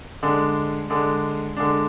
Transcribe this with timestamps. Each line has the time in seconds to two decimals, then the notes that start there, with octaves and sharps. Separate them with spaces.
0.23 D3 G#3 D4
0.90 D3 G#3 D4
1.57 D3 G#3 D4